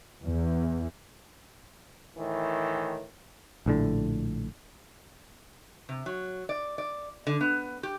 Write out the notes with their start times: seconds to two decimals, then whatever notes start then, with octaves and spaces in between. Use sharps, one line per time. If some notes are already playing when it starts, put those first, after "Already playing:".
0.23 E2
2.16 A2 D#3 E3
3.66 A#1 A2 D3
5.89 C3
6.06 F#3
6.49 D5
6.78 D5
7.27 D3
7.41 B3
7.83 G4